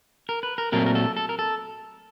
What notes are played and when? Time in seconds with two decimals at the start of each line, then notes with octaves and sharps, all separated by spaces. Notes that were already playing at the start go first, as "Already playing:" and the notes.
0.29 A#4
0.43 B4
0.58 A#4
0.72 A#2 F#3 A3 C4 A#4
0.86 A#4
0.95 A4
1.17 A4
1.29 A#4
1.39 A4